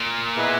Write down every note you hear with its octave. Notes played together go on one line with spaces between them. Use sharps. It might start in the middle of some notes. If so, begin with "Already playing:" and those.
Already playing: A#2
B3 E4 G#4 B4 D#5